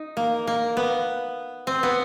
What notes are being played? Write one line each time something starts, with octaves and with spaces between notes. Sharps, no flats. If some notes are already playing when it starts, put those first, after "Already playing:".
Already playing: D#4
A#3
A#3
B3
C4
B3